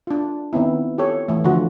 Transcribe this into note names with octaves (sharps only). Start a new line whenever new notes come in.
D4 F4
D#3 B3 C4 E4
F4 G4 A4 C#5
E3 A3
D3 F3 F4 F#4